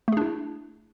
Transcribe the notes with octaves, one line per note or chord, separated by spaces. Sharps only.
A3 D4 E4 G#4